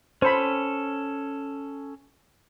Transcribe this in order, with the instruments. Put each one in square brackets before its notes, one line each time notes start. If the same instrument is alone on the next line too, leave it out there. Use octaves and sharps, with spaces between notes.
[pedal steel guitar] C#4 A4 [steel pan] C5 B5